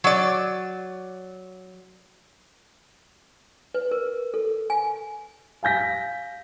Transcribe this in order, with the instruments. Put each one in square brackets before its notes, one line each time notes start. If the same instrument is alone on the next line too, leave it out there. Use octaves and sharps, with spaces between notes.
[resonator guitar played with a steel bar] F#3 D5
[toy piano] B4
A#4
A4
G#5
[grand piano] F5 G#5 G6 A#6 B6